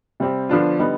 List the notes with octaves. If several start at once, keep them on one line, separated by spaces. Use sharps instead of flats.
C3 G3 C4 G4
D3 F3 B3 D4 F4
D3 G3 B3 D#4